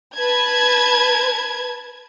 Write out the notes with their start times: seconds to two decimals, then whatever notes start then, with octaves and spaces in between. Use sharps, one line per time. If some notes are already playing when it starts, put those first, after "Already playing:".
0.16 B4 A5 G#6